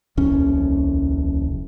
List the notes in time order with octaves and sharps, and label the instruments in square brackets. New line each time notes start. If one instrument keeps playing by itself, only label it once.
[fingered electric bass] D#1 C2 F2 C#4